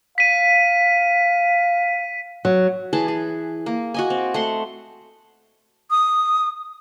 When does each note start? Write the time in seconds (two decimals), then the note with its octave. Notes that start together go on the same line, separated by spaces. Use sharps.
0.18 F5 B6 D#7
2.45 F#3
2.93 E3 G#4 B4 A5
3.08 G#4
3.66 A#3
3.94 F#4 D#5 G#5
4.10 C4
4.34 A3 F#5 C6
5.91 D#6